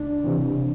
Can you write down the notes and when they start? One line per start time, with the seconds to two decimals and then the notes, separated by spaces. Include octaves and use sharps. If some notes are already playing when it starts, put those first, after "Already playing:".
Already playing: C#2 D4
0.24 C3 E3